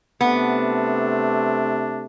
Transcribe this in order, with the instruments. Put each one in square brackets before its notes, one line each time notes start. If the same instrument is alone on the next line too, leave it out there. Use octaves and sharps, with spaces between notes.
[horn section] C3 A3 D4 [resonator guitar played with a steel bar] B3